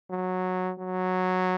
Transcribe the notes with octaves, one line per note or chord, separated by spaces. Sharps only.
F#3
F#3